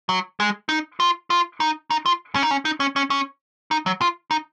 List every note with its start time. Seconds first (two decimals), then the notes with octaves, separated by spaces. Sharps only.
0.09 F#3
0.40 G#3
0.69 D#4
1.00 F4
1.30 F4
1.60 D#4
1.91 D#4
2.06 F4
2.35 C#4
2.43 D#4
2.51 C#4
2.65 D#4
2.80 C#4
2.96 C#4
3.10 C#4
3.71 D#4
3.86 F#3
4.01 F4
4.31 D#4